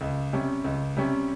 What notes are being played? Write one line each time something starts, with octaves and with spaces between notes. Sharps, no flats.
C#2
C3 G3 C#4
C#2
C3 G3 C#4